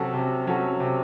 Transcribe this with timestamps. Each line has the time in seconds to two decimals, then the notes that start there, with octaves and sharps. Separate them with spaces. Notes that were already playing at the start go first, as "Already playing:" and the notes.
Already playing: C3 F#3 C#4 F#4 A4
0.14 C3
0.47 F#3 C#4 F#4 A4
0.80 C3